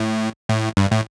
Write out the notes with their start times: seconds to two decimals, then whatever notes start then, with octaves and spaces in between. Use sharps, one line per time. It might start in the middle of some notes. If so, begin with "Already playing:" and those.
Already playing: A2
0.49 A2
0.77 G2
0.91 A2